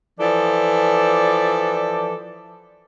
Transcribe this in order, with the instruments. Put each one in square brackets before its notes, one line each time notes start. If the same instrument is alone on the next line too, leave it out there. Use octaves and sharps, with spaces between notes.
[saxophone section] E3 F3 A4 D5